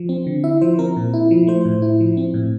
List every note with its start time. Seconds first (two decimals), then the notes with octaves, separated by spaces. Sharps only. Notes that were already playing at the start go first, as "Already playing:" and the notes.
Already playing: F3
0.09 C4
0.27 D3
0.44 E4 E5
0.61 F3 C5
0.79 C4 A#4
0.97 A#2
1.13 E4
1.31 F3
1.47 A3 C5
1.65 A2
1.82 E4
2.00 F3
2.17 C4
2.34 A2